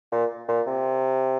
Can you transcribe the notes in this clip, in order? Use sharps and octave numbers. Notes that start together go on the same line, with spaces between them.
A#2
A#2
C3